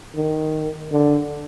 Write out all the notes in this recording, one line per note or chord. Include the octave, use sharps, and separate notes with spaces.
D#3
D3